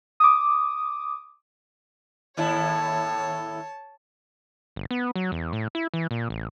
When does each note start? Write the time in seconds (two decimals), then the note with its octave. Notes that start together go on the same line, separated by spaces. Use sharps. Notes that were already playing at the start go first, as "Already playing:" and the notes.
0.20 D6 D#6
2.37 D#2 A2 E4 C#5 A5
4.76 G1
4.91 B3
5.16 F#3
5.32 E2
5.53 A2
5.75 E4
5.94 E3
6.11 A#2
6.30 A1